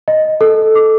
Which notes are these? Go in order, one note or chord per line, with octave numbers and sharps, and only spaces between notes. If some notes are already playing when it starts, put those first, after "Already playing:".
D#5
A4
D6